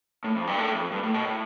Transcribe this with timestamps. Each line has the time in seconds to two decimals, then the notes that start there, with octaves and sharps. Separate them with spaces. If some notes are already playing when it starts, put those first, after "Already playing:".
0.24 A2
0.36 F2
0.47 G2
0.58 A2
0.75 F2
0.92 G2
1.03 A2
1.14 B2
1.25 A2